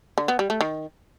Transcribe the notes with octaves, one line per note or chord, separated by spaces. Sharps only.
D3
B3
G3
A3
D#3